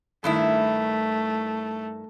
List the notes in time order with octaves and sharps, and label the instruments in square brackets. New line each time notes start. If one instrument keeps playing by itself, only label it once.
[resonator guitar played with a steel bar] G2 D#3 E4 [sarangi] A3